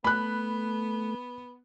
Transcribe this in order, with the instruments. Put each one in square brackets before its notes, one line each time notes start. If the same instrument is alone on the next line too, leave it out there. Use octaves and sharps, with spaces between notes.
[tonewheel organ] A3 [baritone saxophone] B3 [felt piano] B5 F#6